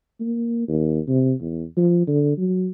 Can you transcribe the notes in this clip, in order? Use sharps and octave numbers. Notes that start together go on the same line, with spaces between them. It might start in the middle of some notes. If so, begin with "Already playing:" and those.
A#3
D#2
C3
E2
F3
D3
F#3